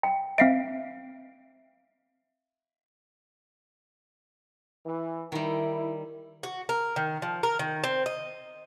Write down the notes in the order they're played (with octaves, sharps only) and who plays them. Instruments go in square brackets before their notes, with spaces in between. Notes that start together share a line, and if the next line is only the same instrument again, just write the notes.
[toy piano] G5
[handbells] C4 C7 D7 [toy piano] E5 F5
[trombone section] E3
[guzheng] D#3 G3 [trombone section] E4
[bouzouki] F#4
A#4
D#3
F3
A#4
D#3
C4
D#5